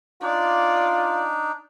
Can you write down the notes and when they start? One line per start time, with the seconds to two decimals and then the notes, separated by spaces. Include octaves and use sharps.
0.22 D4 D#4 F4 D5